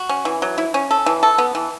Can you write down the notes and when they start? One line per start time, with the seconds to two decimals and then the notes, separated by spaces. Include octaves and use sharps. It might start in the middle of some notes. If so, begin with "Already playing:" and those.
Already playing: F#4
0.09 C#4
0.25 E3
0.42 F#3
0.58 E4
0.74 C#4
0.91 A4
1.06 E3
1.23 A4
1.38 B3
1.55 E3